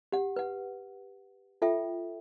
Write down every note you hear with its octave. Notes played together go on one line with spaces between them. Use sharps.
G4 F#5
B4 F#5
F4 A4 E5 G5